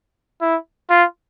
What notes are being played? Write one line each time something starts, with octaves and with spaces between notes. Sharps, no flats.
E4
F4